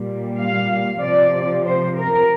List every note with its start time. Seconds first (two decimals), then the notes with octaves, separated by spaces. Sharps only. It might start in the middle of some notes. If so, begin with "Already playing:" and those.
Already playing: A#2 G3
0.37 F5
1.02 C3 F3 D5
1.65 C5
1.97 A#4